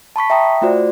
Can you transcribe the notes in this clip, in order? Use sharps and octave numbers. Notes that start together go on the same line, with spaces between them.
A5 B5 C#6 B6
E5 G5 A#5 D#6
A3 F4 F#4 C5 D5